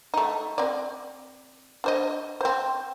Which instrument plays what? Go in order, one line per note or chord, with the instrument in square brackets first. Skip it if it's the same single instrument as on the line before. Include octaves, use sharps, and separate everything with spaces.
[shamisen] A3 D#4
C4 D5
D4 C5 D#5
C4 C5